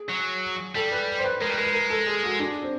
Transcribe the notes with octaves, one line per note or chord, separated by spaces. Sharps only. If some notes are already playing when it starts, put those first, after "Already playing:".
Already playing: G#4
F#3
G3 A4
B4
C5
B4
G#3 A#4
G3 B4
G#3 A#4
B4
A#4
A4
G#4
F#4
D4
C4